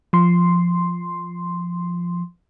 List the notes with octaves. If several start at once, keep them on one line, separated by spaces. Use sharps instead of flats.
F3 C6